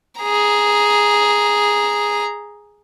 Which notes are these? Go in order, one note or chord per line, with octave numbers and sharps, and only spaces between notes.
G#4 A#5